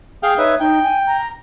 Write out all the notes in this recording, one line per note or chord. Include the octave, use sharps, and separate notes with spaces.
G#4 F5 G5
D#4 B4 C#5 E5
D#4 G5
G#5
A#5